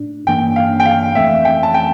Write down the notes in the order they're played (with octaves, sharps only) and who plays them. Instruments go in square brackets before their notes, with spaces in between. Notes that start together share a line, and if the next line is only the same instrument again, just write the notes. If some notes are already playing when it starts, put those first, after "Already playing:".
Already playing: [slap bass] A2 D4
[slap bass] G2 E3 A#3 D4 [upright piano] G5
[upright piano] F5
G5
F5
[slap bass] F2 E3 A3 C4 [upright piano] E5
[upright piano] G5
A5
G5